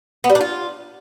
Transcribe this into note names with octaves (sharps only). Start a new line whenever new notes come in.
B3
G3
D4
F4